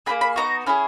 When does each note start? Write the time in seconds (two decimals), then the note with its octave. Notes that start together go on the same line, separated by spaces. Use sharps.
0.06 A#3 D#4 G#4 B5
0.21 B5
0.36 B3 D#4 F#4 A#5
0.66 C#4 E4 G#4